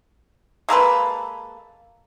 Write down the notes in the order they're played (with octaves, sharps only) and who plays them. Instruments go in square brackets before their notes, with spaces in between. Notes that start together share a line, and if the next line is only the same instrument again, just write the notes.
[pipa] G#3 A#3 A4 B4